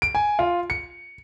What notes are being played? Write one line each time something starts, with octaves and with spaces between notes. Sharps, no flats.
D7
G#5
F4
C#7